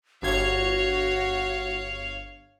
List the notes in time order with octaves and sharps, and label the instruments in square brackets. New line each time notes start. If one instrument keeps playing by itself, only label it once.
[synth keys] G1 G#6 [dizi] F#4 [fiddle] C#5 F5